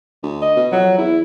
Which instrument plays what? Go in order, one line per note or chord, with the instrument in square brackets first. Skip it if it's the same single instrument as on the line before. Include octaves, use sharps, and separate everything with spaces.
[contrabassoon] D2
[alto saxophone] D#5
[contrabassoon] B2
[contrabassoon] F2 [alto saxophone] F#3
[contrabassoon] E2 [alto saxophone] E4